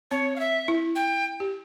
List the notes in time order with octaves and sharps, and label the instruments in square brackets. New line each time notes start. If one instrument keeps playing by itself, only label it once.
[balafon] C4 [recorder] C#5
[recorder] F5
E5
[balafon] E4
[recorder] G5
[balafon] G4